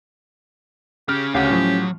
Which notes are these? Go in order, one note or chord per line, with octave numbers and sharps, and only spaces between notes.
C#4 G4 G#4 F6
D2 C#3 C#4 F#4 G4 F5 F#5
A2 F3 F#3